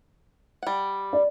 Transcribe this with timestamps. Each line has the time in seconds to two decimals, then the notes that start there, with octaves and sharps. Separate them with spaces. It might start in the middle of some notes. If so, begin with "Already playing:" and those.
0.63 G3 F#5
1.13 D5